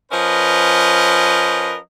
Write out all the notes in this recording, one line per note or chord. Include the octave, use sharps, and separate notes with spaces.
F3 C#4 A#4 B4 D#5